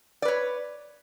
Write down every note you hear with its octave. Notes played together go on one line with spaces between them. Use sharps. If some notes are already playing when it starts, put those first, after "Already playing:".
B4 C#5 D5